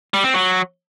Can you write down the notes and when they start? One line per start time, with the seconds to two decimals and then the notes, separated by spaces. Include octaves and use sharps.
0.14 G3
0.24 C4
0.34 F#3